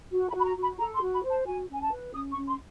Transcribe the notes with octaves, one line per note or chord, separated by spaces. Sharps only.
F#4
B5
F#4
B5
A#5
F#4
B5
A4 A#5
C6
F#4
B5
C5
A5
F#4 G#5
C#4 G#5
A5
B4
C#4 D#6
C#6
C#4
C6